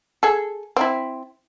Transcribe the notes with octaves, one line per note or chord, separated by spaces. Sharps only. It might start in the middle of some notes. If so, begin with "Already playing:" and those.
G#4 A4
C4 E4